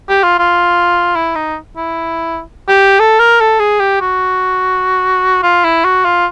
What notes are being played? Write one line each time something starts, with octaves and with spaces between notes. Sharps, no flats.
G4
F4
F4
E4
D#4
E4
G4
A4
A#4
A4
G#4
G4
F#4
F4
E4
F#4
F4